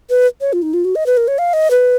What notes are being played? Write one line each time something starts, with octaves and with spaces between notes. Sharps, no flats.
B4
C#5
F4
D#4
F4
F#4
D#5
B4
A#4
C#5
F5
D#5
B4